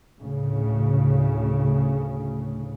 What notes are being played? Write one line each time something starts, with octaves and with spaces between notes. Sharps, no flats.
D2 A2 C#3